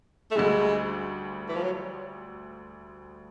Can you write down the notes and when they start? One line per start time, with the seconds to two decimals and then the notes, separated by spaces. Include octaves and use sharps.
0.31 A3
0.36 D2 D3 G3 G#3
1.48 E3
1.56 F3
1.63 F#3